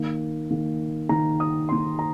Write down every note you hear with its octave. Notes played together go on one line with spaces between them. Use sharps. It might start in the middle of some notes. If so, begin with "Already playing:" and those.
Already playing: D#3 A#3
D#3 A#3
D#3 A#3 A#5
D#6
D#3 A#3 C6
A#5